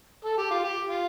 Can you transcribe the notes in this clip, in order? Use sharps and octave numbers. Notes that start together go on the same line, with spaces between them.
A4
G4
F4
G4
F4